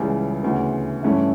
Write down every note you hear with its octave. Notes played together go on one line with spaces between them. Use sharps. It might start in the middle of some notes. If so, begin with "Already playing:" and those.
Already playing: C#2 C#3 E3 G3
D2 C#3 E3 B3
G2 E3 A3 C#4 E4